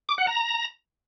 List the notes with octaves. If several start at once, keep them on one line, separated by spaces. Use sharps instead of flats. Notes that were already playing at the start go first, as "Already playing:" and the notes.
D6
F#5
A#5